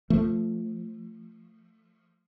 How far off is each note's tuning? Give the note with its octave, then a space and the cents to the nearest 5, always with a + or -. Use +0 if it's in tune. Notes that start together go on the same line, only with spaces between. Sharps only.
F3 +0 A3 +15